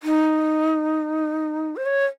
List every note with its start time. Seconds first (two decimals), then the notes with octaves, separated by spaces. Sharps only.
0.03 D#4
1.76 C5
1.85 C#5